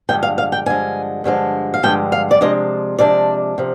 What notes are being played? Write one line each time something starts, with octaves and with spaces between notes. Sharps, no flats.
G2 D3 F3 G#3 G5
F5
F5
G5
G2 D3 F3 G#3 G#5
G2 D3 F3 G#3
F5
G2 D3 F3 G#3 G5
F5
D5
C3 F3 G#3 D4 D#5
C3 F3 G#3 D4 D5
C3 F3